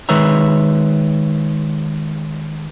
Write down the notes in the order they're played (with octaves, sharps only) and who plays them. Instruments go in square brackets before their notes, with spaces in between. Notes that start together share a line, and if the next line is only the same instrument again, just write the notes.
[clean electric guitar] D#3 G#3 B4 C#5 E5 A#5